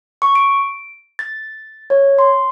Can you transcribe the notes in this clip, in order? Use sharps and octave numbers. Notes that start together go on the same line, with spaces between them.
C#6
D7
A6
C#5
C6